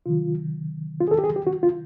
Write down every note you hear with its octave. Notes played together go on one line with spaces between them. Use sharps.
C3 D#3 F#3 F4
F4
G#4
A4
G4
G#4
G4
F#4
F4